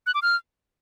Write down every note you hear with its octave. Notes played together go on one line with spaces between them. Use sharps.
F#6
D6
F6